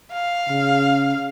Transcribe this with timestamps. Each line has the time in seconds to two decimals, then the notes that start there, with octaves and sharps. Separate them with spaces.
0.13 F5
0.49 C#3